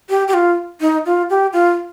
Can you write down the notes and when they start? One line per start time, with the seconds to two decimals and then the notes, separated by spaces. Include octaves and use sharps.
0.10 G4
0.28 G4
0.34 F4
0.81 D#4
1.06 F4
1.30 G4
1.53 F4